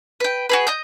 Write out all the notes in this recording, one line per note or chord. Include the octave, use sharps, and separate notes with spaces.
B4 G5
F#4 G#4 B4
D#5 D#6 G6